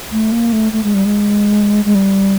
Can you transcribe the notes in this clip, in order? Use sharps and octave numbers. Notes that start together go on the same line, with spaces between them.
A3
A#3
A3
A3
G#3
G3
G#3
G#3
G3